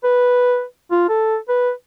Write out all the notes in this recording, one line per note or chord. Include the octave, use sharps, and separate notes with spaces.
B4
F4
A4
B4